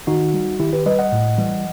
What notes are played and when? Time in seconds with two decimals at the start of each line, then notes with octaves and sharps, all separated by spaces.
0.07 D#3 D#4 F#4
0.34 G3
0.60 D#3 E4 G4
0.73 G4 B4
0.86 G3 B4 D#5
0.99 D#5 F#5
1.12 A2
1.38 E3 G3